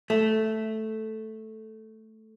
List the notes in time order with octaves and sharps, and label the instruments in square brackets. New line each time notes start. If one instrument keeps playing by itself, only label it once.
[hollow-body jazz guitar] A3